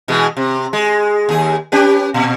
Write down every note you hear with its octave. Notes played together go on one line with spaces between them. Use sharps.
B2 E3 G#3
C3
G#3
D#2 G#4
C#4 G4 B4
A#2